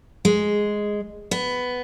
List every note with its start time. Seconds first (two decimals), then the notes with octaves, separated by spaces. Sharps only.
0.25 G#3
1.31 B3